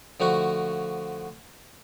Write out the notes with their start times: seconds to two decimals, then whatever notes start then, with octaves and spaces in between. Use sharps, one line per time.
0.20 D3 F3 A3 F#4